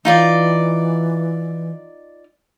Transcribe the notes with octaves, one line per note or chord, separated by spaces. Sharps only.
E3 D#4 F4 D5